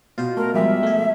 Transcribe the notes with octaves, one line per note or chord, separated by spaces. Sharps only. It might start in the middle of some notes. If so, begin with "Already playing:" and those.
B2 F4 C5
A3 A#4
F3 G3 G#3 E5
A3 G#4